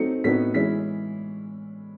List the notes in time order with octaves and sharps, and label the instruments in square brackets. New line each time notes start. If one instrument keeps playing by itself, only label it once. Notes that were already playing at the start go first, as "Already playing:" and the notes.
Already playing: [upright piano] F#3 A3 C4 D#4 C#7
A2 F#3 B3 D#4 B6
E3 G#3 C#4 E4 B6